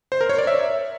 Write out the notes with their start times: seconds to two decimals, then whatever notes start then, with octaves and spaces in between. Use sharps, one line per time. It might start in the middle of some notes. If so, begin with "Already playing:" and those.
0.12 C5
0.21 A#4
0.29 C#5
0.38 D5
0.47 E5